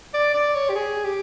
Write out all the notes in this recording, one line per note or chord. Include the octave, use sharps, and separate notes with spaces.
D5
D5
C#5
G4
G#4
G4